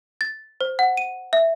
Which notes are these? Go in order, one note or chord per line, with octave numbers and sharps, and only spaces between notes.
A6
C5
F#5
D#7
E5